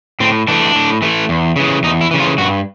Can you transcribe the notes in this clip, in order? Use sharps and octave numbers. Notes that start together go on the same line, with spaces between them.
A2 C4
E3 A3 D4
A2
E3 A3
E2
C#3 E3
E2 D#4
E4
C#3 E3
F4
G2 F#4